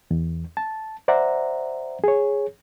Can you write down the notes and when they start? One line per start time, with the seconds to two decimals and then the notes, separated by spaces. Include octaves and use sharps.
0.11 E2
0.57 A5
1.08 C5 D5 E5 F#5 A#5
2.04 G#4 C#5